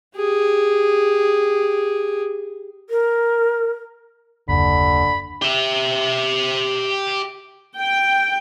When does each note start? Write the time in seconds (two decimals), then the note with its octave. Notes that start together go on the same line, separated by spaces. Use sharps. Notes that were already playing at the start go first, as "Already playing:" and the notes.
0.16 G4 G#4
2.90 A#4
4.49 F#1 D#2 D3 B5
5.42 G4 E5
7.79 G5